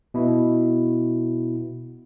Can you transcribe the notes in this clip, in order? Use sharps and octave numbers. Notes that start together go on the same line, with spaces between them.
B2 E4